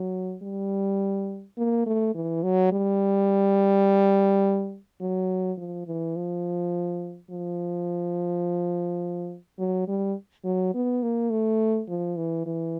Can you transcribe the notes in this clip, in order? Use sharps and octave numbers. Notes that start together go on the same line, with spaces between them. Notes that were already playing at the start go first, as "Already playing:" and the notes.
Already playing: F#3
G3
A#3
A3
E3
F#3
G3
F#3
F3
E3
F3
F3
F#3
G3
F#3
B3
A#3
A3
F3
E3
E3